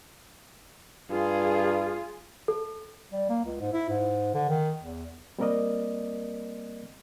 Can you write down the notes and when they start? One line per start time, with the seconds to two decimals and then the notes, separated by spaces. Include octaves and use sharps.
1.10 G2 F4 G#4
2.48 A4
3.12 G3
3.29 A#3
3.44 C#2
3.60 G#2
3.73 E4
3.89 G#2
4.34 D3
4.49 D#3
4.83 E2
5.39 G3 A#3 C4 A#4 D5 D#5